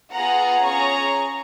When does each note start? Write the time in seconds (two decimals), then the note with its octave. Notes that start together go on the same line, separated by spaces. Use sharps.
0.13 B3 F4 G#4 F#5 A#5
0.64 C#4 G#4 A#5 C#6